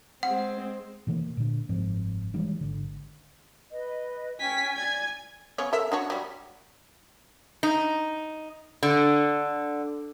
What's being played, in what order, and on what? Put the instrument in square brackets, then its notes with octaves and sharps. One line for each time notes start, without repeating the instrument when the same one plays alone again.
[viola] G#3 C4 [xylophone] F#5
[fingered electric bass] B2 D#3 E3 A#3
A#2 D3
F#1 G#2 F3 C4
D#3 E3 G3 G#3
G#1 D3
[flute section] B4 D#5
[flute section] C#4 G5 [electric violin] G#5 B6
[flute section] D5 [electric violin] G#5 G#6
[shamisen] C#3 B3 C#5
A4 A#4 E5
D4 F#4 C#5
F#3 G3
[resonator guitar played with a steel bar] D#4
D3